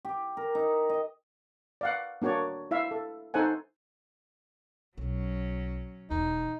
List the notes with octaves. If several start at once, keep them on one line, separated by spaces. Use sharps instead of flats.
G4
A#4
D#4
D#5
D5 F5 F#5
A#3 D4 F#4 C#5 D5
E4 E5 F5
A4
D#4 A4 C5 F#5 G#5
B1 F#3 C#4
E1 E2 D#4